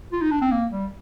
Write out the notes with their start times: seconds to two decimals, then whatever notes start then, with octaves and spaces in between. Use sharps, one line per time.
0.12 F4
0.22 D#4
0.31 D4
0.41 C4
0.51 A#3
0.72 G3